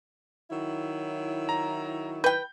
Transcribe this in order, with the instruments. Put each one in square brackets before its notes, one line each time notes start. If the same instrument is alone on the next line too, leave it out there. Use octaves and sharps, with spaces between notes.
[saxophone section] D#3 F#3 E4
[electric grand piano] A#5
[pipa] B4 G5 [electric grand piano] G6